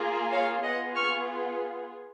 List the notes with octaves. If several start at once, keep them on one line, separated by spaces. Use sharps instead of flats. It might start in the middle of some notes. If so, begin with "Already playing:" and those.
Already playing: A#3 F4 G#4
C#5 F5
B3 F4 G#4 D#5 F#5
C#6 F6